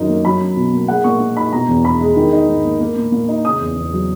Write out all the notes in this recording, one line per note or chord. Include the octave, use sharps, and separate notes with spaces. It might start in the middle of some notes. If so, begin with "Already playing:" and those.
Already playing: F#2 D#3 D#4
A#3
F#3 B5
C#4
B2
A#3
G#3 F#5
A#2 C#6
A#2
D#4 B5
B2 A#5
E2
E2 B5
G#3
D#3
D#4
G#2
A#3
A#3
A#2
A#2
D#4
C#3 D#6
E2
E2
F#3